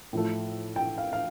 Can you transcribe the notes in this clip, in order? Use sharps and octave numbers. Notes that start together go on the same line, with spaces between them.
A2 F3 A3
G5
F5
F5